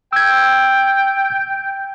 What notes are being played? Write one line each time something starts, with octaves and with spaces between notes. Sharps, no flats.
G5 E6 G#6